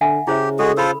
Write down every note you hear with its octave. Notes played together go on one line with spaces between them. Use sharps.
D3 E5 F#5 G#5
C#3 E4 G4 C5 E5
G#3 F#4 G#4 A4
F4 A4 C5 B5 E6